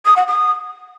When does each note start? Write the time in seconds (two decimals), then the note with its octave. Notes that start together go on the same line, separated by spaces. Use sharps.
0.05 D#6
0.16 F#5
0.27 D#6